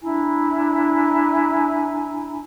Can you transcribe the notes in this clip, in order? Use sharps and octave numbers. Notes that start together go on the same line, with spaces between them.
D4 E4 G#5 A#5